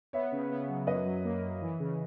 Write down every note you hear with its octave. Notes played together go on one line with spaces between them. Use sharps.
B3 C#5 E5
C#3
B3
F#3
F#2 B4 D#5
F#3
A#3
F#2
E3
C#3